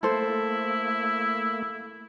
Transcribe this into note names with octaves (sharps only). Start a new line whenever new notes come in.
A3 A#3 E4 A4 C5